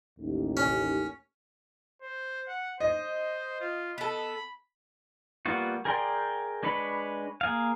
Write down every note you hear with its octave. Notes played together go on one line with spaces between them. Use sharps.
A1 D#2
C#4
C5
F#5
C5 D#5
F4
B3 A4 B5
G3 A#3 B3 F4 F#4
G#4 A#4 D5 G5 C6
G#3 D4 B4 C#5 B5
A#3 G#4 F5